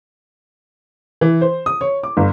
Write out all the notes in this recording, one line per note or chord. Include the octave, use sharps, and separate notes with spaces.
E3
C5
D#6
C#5
D6
G1